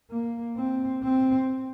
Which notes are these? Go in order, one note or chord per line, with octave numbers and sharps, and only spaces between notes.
A#3
C4
C4